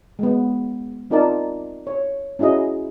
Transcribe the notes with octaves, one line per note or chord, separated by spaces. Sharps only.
G#3 B3
C4 D#4 F4 A#4 D5 A5
C#5
C#4 E4 F#4 G#4 D#5